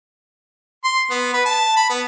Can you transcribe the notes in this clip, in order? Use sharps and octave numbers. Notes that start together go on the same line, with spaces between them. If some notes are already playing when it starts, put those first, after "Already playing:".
C6
B3
B4
A5
B5
B3